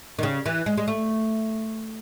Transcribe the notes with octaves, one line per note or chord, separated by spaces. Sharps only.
D#3
C#3
E3
G#3
G#3
A3